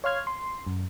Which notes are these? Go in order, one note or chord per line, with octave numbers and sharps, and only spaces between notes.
C#5 F5 C6 F6 G#6
C6
F#2